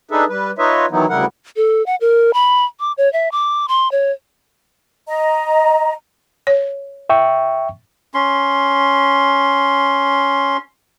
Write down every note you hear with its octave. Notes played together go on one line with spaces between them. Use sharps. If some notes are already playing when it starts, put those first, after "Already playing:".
D4 D#4 G#4 A4 B4 E5
G3 B4
D#4 F4 B4 C#5 D#5 E5
D#3 E3 F#3 B3 D#4 E4
D2 C#3 G3 E4 A#4 F#5
A4
F#5
A#4
B5
D6
C#5
E5
D6
C6
C#5
D#5 A#5
C#5
E5 G5 C#6
C#4 C6